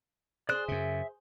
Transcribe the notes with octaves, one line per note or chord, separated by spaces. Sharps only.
G#4 C5 D5 F#6
F#2 C#3 E5